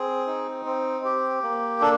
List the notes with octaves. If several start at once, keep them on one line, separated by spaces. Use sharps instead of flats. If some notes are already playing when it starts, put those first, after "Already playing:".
Already playing: C4 G#4
D#4
C4
G4
A#3
D4 A4